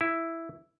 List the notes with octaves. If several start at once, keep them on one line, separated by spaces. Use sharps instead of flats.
E4